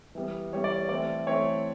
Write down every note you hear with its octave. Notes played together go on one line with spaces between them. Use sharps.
E3 G3 B3
E3 G3 B3 C#5
D5
C#5
E3 A3 C4 D5
E3 A3 C4 C#5